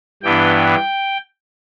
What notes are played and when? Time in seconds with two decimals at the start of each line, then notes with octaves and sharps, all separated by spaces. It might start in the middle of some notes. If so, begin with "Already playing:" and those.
0.23 G2 E3 B3 D4 G5
0.56 G5